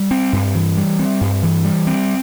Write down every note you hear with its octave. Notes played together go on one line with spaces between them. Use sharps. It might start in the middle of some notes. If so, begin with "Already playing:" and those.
Already playing: G3
C4
G2
E3
G3
C4
G2
E3
G3
C4